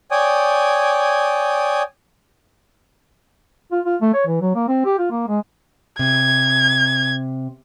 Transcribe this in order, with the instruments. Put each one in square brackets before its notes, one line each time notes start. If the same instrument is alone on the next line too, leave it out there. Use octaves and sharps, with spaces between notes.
[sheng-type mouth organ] C#5 D5 G5 G#5 D#6
[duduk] F4
F4
A3
C#5
E3
F#3
A#3
C4
G4
F4
A#3
G#3
[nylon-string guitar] C3 [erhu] G#6